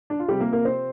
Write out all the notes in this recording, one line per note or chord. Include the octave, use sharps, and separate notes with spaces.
D4
F4
C3 F3 G3 G4
A#3 A#4
A#3 A#4
C4 C5